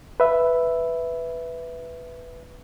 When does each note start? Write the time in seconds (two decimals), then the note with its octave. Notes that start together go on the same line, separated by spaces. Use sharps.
0.20 B4 E5